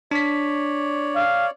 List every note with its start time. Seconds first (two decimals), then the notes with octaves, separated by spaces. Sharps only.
0.11 D4 C#5 D5 B6
1.15 F5